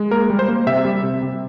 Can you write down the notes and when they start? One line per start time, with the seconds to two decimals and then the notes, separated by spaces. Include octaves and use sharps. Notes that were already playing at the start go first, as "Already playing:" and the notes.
Already playing: G#3
0.11 A#3 A#4
0.30 G3
0.39 C5
0.49 A#3
0.67 C3 E5
0.85 G3
1.03 C3
1.22 C3